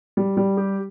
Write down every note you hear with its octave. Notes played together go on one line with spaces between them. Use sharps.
G3
G3
G4